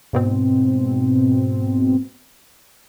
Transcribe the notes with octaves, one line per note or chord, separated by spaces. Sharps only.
G#2 B2 C4